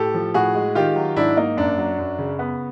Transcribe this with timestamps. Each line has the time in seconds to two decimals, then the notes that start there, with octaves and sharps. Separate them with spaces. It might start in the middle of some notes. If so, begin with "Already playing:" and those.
Already playing: A2 G4 A4
0.14 F3
0.34 A2 F#4 G#4
0.55 G#3
0.75 D#3 F4 G4
0.96 F#3
1.16 G#2 D4 E4
1.37 A#3 D#4
1.57 F#2 D4
1.78 F#3
1.99 F#2
2.19 C#3
2.39 B3